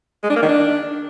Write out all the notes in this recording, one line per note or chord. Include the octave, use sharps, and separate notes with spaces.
G#3
D4
A#3
D#3
D4